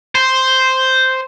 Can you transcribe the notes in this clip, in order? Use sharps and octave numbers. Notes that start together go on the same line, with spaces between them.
C5